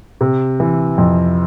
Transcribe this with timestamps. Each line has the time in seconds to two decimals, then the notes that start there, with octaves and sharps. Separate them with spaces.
0.21 C3
0.60 E3
0.98 F2